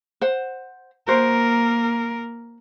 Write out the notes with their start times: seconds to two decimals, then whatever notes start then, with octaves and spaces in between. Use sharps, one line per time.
0.21 C5 F#5
1.08 A#3 F#4 A#4 C5